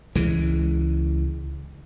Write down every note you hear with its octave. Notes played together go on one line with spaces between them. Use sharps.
C#2 E3 G#3